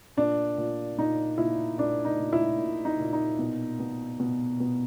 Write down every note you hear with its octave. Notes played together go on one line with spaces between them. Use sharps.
A#2 D4
A#2
A#2 D#4
A#2 E4
A#2 D4
D#4
A#2
E4
A#2
D#4
A#2
D#4
B2
B2
B2
B2